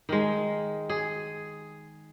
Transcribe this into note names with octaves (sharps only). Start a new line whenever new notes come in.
D#3 G#3
G#4